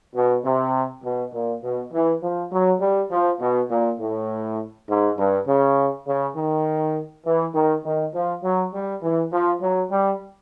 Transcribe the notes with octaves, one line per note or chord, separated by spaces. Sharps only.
B2
C3
B2
A#2
B2
E3
F3
F#3
G3
F3
B2
A#2
A2
G#2
G2
C#3
C#3
D#3
E3
D#3
D#3
F3
F#3
G3
E3
F3
F#3
G3